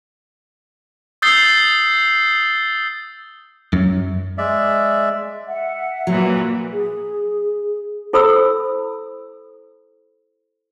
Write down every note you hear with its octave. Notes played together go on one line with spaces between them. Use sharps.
D#6 E6 G6 A6 C7 G7
F#2
G#3 D5 E5
E5 F#5
A#2 E3 F#3
G#4
E4 A4 C5 B5 D#6 E6